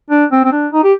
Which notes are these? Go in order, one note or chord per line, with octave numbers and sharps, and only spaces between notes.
D4
C4
C4
D4
D#4
G4